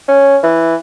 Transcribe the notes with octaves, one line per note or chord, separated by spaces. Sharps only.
C#4
E3